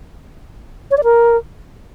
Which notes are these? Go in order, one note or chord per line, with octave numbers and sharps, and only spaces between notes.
C#5
D5
A#4